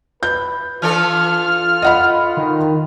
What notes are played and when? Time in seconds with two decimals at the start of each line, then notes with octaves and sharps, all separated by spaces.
0.23 B4 G6
0.82 E3 D4 F4 A4 F6
1.82 D#5 F#5 B5
2.37 D#3